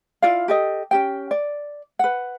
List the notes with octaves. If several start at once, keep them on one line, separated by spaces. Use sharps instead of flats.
E4 F4 D5 F5
G4 A4 D#5
C#4 G4 G5
D5
B4 F#5